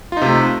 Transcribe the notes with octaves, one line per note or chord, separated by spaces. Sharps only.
C3 A3 D#4 F4